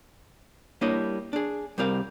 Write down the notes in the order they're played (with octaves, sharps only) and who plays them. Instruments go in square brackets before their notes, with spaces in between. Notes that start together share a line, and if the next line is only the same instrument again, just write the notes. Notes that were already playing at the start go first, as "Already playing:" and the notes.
[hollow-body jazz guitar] G3 A#3 D4 E4 C#5 D#5
D4 G#4
C2 G3 C4 A#4 F5